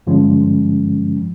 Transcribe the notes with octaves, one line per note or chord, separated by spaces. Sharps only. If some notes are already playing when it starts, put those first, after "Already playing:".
G2 D3 F3 G#3 C#4